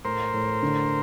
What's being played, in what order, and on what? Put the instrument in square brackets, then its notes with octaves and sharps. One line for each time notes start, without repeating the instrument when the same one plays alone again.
[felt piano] A2 [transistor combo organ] A#4 C5
[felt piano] A2
D3